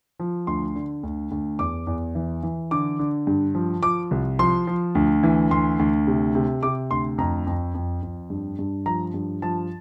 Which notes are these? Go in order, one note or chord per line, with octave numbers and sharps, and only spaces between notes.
F3
D2 C6
D3
D2
D2
E2 D6
E2
E3
E3
D3 D6
D3
G2
F3
F3 D6
C2
F3 C6
F3
D2
E3
D2 C6
D2
C3
C3
C3 D6
D2 C6
F2 A#5
F2
F2
F2
G2
G2
F3 A#5
G2
F3 A5